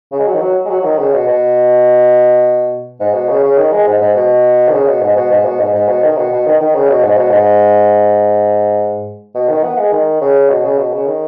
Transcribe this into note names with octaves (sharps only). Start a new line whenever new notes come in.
C#3
G#3
F#3
D#3
F#3
G#3
F#3
F#3
D#3
C#3
B2
B2
G#2
B2
C#3
C#3
D#3
G#3
G#2
G#2
B2
D#3
C#3
B2
G#2
B2
G#2
B2
G#2
G#2
B2
D#3
B2
B2
D#3
D#3
C#3
B2
G#2
B2
G#2
B2
D#3
B3
G#3
D#3
C#3
B2
C#3
B2
C#3
D#3